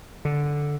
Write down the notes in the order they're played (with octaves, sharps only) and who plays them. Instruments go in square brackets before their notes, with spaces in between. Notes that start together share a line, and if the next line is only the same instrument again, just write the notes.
[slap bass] D3